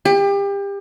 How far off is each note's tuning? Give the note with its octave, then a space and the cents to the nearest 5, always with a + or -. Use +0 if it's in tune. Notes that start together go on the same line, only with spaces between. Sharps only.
G4 +30